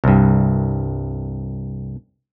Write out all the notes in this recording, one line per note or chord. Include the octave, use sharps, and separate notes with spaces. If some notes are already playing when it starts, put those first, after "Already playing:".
C2 G2